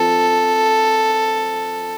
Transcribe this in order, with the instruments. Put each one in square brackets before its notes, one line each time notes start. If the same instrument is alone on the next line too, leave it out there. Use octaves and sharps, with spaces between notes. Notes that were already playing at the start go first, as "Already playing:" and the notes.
Already playing: [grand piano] F3 C4 F4 [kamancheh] A4